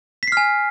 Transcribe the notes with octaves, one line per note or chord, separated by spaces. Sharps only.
G#5 F6 B6 C7